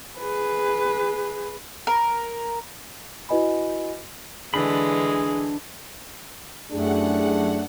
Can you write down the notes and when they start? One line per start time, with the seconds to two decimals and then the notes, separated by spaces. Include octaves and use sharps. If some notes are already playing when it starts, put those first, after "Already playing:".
0.18 G#4 B4
1.87 A#4
3.29 E4 F#4 B4 D#5 G#5 B5
4.54 D3 E3 G#3 D4 G#4 B5
6.72 F#2 A3 D4 E4 G4 G#4 F#5